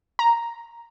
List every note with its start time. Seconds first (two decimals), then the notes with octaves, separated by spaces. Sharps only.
0.19 A#5